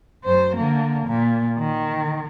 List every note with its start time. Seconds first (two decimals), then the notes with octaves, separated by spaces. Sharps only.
0.24 F#2 C5
0.56 D3 A#3
1.07 A#2
1.59 D#3